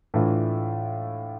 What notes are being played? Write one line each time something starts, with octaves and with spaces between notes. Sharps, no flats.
A2 E3 A3 D4 F4